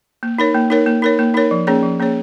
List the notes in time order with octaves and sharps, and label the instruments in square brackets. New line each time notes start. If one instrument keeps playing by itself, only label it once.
[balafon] A#3
D#4 A#4 C#5
A#3
D#4 A#4 C#5
A#3
D#4 A#4 C#5
A#3
D#4 A#4 C#5
F3
A#3 C#4 G#4 C#5
F3
A#3 C#4 G#4 C#5